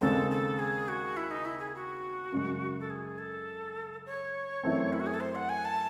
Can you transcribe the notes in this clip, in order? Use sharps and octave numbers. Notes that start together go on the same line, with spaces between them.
D#2 C#3 G#3 C4 A4
A4
G#4
F#4
E4
D#4
E4
G#4
F#4
F#2 C#3 G#3
A4
G#4
A4
C#5
F#2 E3 A3 C4
E4
F#4
G#4
A4
C5
F#5
G#5
A5